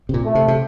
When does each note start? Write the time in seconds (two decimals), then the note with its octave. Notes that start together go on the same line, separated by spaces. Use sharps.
0.09 C3
0.14 A#2
0.25 A3
0.35 C3
0.48 C3